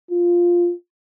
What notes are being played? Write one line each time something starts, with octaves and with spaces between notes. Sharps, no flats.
F4